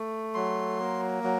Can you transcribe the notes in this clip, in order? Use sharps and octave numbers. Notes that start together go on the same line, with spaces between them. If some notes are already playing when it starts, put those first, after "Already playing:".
Already playing: A3
F#3 C6
A#3
F#3